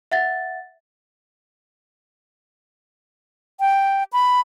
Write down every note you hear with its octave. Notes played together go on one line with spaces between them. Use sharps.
E5 F#5 A6
G5
B5